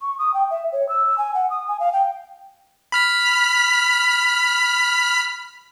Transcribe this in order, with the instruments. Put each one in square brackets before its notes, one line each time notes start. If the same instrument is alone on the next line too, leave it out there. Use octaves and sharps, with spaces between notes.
[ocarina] C#6
D#6
G5
E5
C#5
E6
G#5
F#5
D#6
G#5
F5
G5
[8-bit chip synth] B5 F6 B6